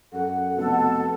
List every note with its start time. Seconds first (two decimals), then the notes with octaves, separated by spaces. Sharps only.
0.13 F#2 A4 F#5
0.57 F1 B2 A4